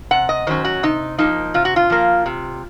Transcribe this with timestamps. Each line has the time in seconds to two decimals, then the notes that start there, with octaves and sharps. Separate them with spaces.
0.11 C3 F#5
0.29 D#5
0.47 D#3 F#3 C#4 C5
0.64 F#4
0.83 C3 D#4
1.18 F3 A#3 D#4
1.54 C3 F4
1.65 F#4
1.76 F4
1.90 F3 A#3
2.26 C3